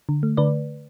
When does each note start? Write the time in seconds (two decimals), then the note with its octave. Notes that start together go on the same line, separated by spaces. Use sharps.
0.09 D3
0.23 A3
0.37 D3 B4 D5